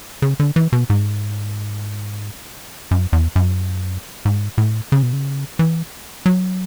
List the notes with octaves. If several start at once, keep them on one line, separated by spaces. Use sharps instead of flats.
C#3
D3
E3
B2
G#2
F#2
E2
F#2
G#2
A2
C#3
B2
C#3
E3
F#3